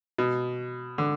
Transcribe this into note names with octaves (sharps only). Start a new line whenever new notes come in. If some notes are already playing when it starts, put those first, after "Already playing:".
B2
D3